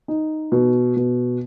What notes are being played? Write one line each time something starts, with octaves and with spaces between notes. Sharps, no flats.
D#4
B2
B2